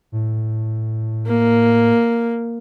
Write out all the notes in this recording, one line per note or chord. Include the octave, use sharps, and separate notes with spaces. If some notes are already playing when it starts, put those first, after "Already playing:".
A2
A#3